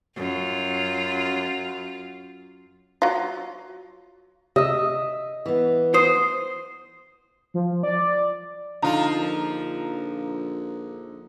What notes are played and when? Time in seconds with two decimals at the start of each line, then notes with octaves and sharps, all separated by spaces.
0.16 F#2 F4
3.02 F#3 F4
4.56 C3 D#5 E5 E6
5.46 E3 B3
5.94 C5 D#6
7.54 F3
7.83 D5
8.82 D3 F3 D#4 F4 A#5
9.16 A#1